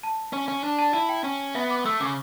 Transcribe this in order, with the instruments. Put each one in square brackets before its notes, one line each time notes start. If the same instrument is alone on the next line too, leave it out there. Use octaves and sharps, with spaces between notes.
[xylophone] A5
[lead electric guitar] C#4
C#4
[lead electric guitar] D4 [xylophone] A5
[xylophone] A5
[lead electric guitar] E4 [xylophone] A5
[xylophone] G5
[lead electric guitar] C#4
[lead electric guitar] B3 [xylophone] E5
[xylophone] D6
[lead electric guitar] A3 [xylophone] E6
[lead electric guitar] C#3 [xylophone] D6